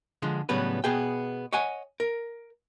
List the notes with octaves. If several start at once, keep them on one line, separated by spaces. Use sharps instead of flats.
D3 F3 G#3
A2 C#3 F#3 G3 B3 B4
B2 B3 G#4 G5
C#5 D#5 F#5 G#5
A#4